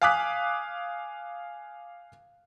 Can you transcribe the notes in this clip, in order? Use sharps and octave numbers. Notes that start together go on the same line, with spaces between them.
F5 G#5 D6 D#6 F#6 B6